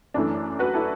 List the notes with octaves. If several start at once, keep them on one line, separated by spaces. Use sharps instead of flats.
F#2 E3 A3 D4
F#4 B4
E4 A4